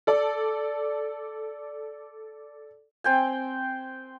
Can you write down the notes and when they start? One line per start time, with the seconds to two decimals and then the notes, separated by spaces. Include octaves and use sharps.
0.07 A4 D5
3.04 C4 G5 G#5